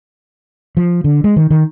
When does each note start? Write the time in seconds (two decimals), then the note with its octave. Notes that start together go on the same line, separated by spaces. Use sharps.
0.77 F3
1.04 D3
1.24 G#3
1.36 D#3
1.50 D#3